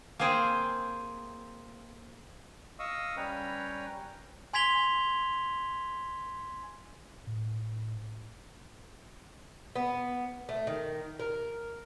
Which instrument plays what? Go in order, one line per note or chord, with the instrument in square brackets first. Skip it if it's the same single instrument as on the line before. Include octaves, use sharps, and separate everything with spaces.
[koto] A#3 C4 G#4 C5 G5
[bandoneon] D#5 F5 C#6 D#6 E6
G3 C#4 B4 C#5 G5 A#5
[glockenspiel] G#5 C6 G#6 B6 F7 G7
[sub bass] A2
[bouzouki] B3
A3
D#3
A#4